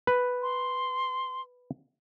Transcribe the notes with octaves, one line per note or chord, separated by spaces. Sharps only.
B4
C6